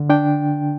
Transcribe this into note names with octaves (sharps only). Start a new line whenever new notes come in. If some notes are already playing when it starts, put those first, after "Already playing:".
Already playing: D3
D4 G5